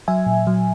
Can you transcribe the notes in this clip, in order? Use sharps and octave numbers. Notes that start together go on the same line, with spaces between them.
F#3 E5 G#5
A#2
F#3